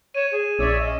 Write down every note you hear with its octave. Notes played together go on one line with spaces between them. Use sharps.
C#5 D#7 E7
G#4
A#1 C#5 D5 E5
C#4 D#5